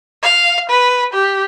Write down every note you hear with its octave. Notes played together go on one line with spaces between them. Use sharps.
F5
B4
G4